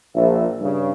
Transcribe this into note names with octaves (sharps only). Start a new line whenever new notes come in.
A#1 E5
G2 C#3